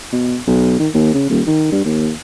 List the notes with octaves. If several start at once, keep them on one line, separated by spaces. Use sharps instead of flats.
B2
B1
D#3
D#2
C#3
D#1
D#3
G2
D#2